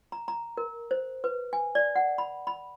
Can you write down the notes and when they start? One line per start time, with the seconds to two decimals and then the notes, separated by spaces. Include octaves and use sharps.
0.12 A#5
0.28 A#5
0.57 A#4
0.91 C5
1.24 B4
1.53 G#5
1.75 D5
1.96 F#5
2.18 B5
2.47 B5